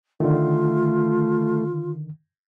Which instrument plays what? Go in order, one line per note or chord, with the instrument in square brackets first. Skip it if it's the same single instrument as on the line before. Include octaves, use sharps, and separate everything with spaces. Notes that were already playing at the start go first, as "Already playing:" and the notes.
[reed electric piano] D3 D#3 [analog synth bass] A3 [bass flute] F4